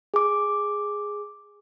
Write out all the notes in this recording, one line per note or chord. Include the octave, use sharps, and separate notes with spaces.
G#4 D6